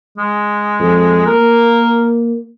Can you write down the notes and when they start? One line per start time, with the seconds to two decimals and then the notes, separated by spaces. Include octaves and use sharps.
0.18 G#3
0.79 F2
1.27 A#3 A#4